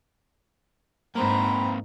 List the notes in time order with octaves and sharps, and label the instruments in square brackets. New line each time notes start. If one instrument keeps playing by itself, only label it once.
[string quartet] G#2 [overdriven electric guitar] A#3 C4 [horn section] C5 F#5 B5 [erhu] A#5